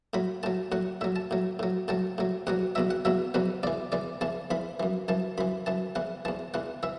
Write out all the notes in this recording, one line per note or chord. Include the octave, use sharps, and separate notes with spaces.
A2 F#3 B5
A2 F#3 A5
A2 F#3 F#5
A2 F#3 E5
A5
A2 F#3
A2 F#3
A2 F#3 A5
A2 F#3
E2 B2 F#3 F#5
E2 B2 F#3 E5
F#5
E2 B2 F#3 E5
E2 B2 F#3 B4
E2 E3 D5
E2 E3 D5
E2 E3 A5
E2 E3 B5
F#2 E3
F#2 E3 A5
F#2 E3 B5
F#2 E3 A5
E2 E3 F#5
E2 E3 A5
E2 E3 F#5
E3 E5